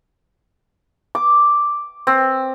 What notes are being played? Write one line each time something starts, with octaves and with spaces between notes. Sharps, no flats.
D6
C4